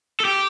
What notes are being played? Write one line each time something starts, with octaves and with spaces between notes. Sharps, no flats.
A4
G4